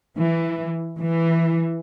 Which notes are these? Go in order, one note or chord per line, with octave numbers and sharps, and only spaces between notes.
E3
E3